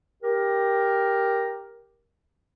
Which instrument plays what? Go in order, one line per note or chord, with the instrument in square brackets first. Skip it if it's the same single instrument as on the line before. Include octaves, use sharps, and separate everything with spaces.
[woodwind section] G4 A#4